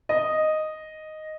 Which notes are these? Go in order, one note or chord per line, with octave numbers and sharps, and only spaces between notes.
D#5